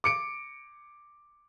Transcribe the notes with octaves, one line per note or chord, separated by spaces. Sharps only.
D6 C#7 D7